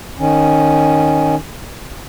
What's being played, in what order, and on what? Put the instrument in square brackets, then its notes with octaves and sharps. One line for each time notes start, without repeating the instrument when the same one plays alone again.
[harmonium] D#3 C#4